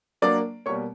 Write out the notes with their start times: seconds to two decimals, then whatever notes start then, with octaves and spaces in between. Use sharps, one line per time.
0.22 F#3 A#3 D4 D5 D6
0.66 B2 G3 A#3 C#5 C#6